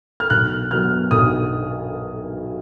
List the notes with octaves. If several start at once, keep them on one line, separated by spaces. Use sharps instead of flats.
F6
B1 F#6
B2 F#3 B3 F6
B1 D#6